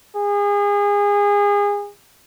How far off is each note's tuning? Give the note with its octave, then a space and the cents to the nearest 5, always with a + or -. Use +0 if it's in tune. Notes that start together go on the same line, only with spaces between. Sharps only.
G#4 -30